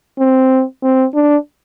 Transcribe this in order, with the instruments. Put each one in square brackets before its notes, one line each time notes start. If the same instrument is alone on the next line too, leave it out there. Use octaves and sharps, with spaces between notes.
[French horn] C4
C4
D4